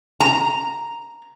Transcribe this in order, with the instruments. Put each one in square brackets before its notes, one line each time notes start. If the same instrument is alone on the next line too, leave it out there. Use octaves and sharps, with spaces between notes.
[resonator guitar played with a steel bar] A#5